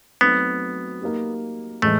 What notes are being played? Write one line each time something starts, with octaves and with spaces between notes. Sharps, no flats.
F#3 A3 B3 C4 D#4
A#3 D#4 G4
A2 E3 G#3 A3